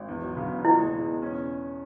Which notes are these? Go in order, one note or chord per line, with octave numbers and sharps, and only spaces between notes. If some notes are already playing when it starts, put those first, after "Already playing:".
Already playing: G#1
E2
F#3
C#3
E2
D#4 E4
G#3
B2
E2
C#4